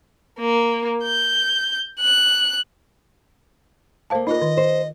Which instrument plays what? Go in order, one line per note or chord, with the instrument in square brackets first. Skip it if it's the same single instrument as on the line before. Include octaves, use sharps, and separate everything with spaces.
[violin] A#3
G6
F#6
[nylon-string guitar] D2 A#3 [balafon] C5 F5 A5
[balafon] D#4 F4 A#4 [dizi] D#5
[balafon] D#3
[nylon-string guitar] C5